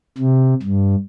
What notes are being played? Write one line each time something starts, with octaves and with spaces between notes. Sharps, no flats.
C3
G2